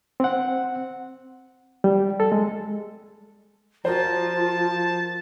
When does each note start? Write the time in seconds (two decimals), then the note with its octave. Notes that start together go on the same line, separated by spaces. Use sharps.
0.20 C4 F#5
1.84 G3
2.20 A4
2.32 G#3
3.85 F3 F4 F#4 A#4 C5 A5